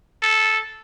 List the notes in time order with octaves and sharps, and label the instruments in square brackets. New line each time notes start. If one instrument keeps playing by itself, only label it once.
[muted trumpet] A4